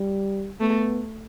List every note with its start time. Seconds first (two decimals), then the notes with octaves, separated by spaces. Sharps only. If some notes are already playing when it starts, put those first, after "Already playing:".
Already playing: G3
0.60 A3 B3